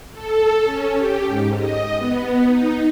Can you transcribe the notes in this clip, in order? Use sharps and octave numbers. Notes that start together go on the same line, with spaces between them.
A4
C#4
G4
G#2
D#5
B3
D#4